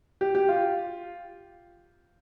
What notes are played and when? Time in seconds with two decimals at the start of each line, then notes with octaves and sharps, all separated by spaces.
0.21 G4
0.35 G4
0.49 F4